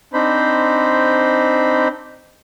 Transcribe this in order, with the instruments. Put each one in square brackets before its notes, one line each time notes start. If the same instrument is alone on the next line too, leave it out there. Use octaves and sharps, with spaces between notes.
[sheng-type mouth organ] C4 D4 D#4 C5 B5